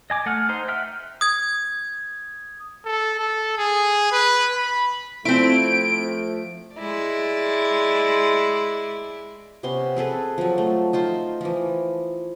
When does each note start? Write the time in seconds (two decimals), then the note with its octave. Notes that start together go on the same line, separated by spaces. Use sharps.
0.10 D#5 G#5 D6
0.26 A3 F#5 G#5 F6
0.49 D#4 C5
0.68 E5 F#5 G5 F6
1.21 D#6 G#6
2.86 A4
3.19 A4
3.58 G#4
4.12 B4
4.54 B5
5.25 F3 A3 C4 E4 D7
6.76 G#3 E4 D5
9.63 C3 B3 C#4 C6
9.96 C4 G#4 A4 B4
10.38 F3 F#3
10.58 A3
10.93 D#4 F4 C5
11.41 E3 F3